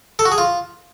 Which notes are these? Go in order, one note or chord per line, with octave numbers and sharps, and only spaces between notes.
A4
F#4
G#4
F4